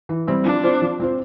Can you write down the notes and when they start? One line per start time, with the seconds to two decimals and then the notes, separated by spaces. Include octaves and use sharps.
0.09 E3
0.27 G3 C4 E4
0.45 F3 D4
0.64 C4 F4 C5
0.82 F3
1.00 C4 F4 C5